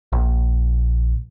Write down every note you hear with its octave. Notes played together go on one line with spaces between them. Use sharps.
A#1